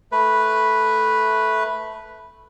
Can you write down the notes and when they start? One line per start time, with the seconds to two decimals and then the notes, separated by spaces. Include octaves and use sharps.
0.12 A3 B4